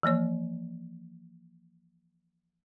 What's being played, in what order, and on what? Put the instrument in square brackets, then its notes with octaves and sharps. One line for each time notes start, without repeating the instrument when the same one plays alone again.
[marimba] E3 F3 A#3 C#5